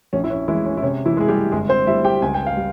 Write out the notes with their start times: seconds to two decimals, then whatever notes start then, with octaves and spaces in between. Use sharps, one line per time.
0.13 A#1 C#4
0.24 E4
0.30 C#4
0.48 E3 G#3 E4
0.65 C#4
0.77 E4
0.82 C3 C#4
1.05 E3 E4
1.17 G#3 G#4
1.28 G3 G4
1.52 G1 G#3 G#4
1.69 C4 C5
1.87 G3 E4 E5
2.05 G4 G5
2.22 C#2 G#5
2.34 G5
2.47 F5
2.57 G3